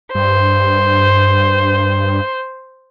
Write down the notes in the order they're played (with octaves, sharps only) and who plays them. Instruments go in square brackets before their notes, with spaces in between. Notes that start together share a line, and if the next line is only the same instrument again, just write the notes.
[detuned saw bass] G2 [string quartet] C5